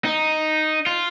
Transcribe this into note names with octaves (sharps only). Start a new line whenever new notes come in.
D#4
F4